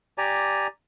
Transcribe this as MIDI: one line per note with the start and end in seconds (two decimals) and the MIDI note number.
0.18 0.67 67
0.18 0.67 74
0.18 0.67 80
0.18 0.67 82